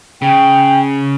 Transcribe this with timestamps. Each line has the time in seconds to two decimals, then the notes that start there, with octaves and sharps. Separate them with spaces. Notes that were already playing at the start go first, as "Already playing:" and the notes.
0.22 C#3 G5